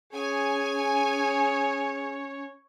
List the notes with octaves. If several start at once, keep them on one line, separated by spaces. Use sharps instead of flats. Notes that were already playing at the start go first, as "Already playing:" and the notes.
C#4 G#4 C#5 G#5